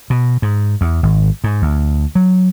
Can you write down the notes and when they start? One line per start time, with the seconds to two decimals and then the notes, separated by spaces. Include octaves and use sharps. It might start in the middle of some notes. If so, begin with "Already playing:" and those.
0.10 B2
0.42 G#2
0.81 E2
1.03 G#1
1.44 G#2
1.62 D2
2.15 F#3